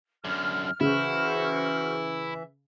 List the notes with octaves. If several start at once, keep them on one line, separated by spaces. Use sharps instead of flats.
F#2 D3 F6
C#3 E3 E4 F#4 C5 E5 F6